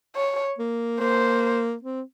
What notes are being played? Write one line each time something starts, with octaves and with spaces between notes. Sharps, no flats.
C#5
A#3
A#3 C5
C4